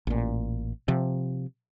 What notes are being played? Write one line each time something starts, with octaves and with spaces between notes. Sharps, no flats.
A1 A#2
C3 F3